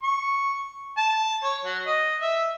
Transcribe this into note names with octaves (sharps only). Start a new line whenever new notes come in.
C#6
A5
C#5
F#3
D#5
E5